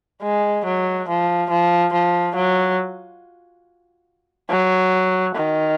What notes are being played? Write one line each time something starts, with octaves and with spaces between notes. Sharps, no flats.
G#3
F#3
F3
F3
F3
F#3
F#3
D#3